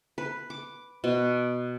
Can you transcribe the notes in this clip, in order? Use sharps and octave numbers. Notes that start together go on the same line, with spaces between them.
B4
D6
B2